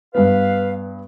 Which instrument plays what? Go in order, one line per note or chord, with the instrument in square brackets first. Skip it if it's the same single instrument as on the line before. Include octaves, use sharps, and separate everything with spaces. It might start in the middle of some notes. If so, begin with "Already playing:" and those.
[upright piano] G2 B3 [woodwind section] B4 F5